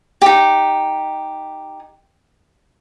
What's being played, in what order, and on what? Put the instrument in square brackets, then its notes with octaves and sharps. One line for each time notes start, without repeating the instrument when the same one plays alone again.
[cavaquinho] D#4 G4